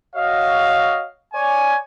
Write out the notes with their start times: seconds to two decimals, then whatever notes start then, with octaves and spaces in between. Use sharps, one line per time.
0.15 F#4 C#5 D#5 F5
1.34 C#5 D5 G#5